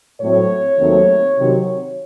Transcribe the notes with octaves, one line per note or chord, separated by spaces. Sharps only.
A2 F#3 A3 C4 C#5
D#2 D#3 F#3 A3 C4
C3 D#3 F#3